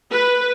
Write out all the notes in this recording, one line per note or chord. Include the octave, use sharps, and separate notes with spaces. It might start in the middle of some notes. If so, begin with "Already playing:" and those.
B4